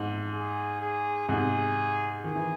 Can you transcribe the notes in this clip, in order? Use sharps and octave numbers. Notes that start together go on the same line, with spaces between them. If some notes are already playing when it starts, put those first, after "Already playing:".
Already playing: G#2
G#4
G#4
G#2 C3 G#4
D#3 G#4
E3